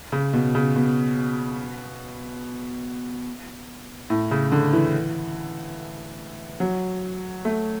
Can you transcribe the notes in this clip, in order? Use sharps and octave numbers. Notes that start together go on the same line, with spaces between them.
C#3
B2
C#3
B2
A2
C#3
D3
E3
F#3
A3